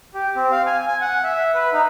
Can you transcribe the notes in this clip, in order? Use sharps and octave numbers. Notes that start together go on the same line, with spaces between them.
G4
C4
F5
G#5
G#5
F#5
E5
B4
D#4